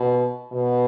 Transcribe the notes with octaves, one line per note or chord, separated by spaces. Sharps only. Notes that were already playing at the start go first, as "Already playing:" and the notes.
Already playing: B2
B2